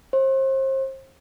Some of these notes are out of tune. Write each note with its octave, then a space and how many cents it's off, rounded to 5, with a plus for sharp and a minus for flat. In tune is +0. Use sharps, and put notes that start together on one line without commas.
C5 +35